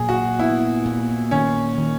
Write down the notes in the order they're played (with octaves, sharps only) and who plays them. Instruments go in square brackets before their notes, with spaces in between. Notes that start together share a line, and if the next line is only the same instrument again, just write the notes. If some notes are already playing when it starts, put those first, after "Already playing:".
Already playing: [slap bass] A#2 F#3 [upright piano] G#4
[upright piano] F#4
[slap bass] B3 [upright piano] E4
[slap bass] A#2
[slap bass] D#3 [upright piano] C#4
[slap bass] D#3